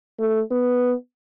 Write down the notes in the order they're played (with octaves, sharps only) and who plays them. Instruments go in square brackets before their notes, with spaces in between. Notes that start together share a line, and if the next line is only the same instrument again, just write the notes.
[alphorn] A3
B3